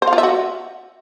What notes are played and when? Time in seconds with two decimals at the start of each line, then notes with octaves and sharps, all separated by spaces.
0.02 C5
0.07 F5
0.13 F4
0.18 E5
0.23 F#4